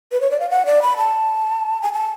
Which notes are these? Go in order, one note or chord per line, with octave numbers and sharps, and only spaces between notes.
B4
C#5
D5
F5
F#5
D5
B5
A5
G#5
A5